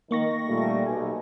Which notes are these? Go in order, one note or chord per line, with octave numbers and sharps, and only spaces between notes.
D#3 A#3 C#6 A#6
A#2 G3 A3
B1 G#5